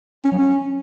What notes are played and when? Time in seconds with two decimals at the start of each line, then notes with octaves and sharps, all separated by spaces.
0.25 C#4
0.32 F#3
0.39 C#4